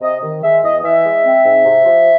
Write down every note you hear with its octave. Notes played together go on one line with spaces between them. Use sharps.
C3 D#5
D#3
G#3 E5
E2 D#5
E3 E5
G#3
C4
G#2
C3
F3